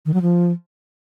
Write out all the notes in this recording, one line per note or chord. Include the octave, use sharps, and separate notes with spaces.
D#3
F#3
F3